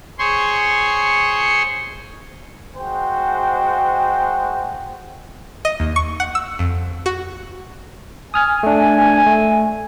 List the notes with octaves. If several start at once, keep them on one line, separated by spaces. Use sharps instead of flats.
G#4 C5 C#5 C6 C#6
G#3 F#4 C5 G5
D#5
D#2
C#6
F#5
E6
F2
F#4
G#5 D#6 F6 G#6
A3 D4
A3